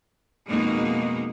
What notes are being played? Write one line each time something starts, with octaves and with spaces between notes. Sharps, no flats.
F2 B2 G#3 A#3 D#4